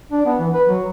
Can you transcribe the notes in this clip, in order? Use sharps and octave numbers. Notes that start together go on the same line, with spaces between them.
D4
B3
E3
B4
F#3